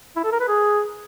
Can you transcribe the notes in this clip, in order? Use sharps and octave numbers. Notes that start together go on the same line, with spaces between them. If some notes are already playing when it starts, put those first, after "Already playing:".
E4
A4
A#4
B4
G#4